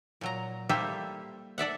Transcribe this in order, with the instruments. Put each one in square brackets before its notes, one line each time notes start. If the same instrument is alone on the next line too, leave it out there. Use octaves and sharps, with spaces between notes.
[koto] A#2 F#3 A#5
G3 A#3 G4 A4 C5 E5
A4 D5 E5 F#5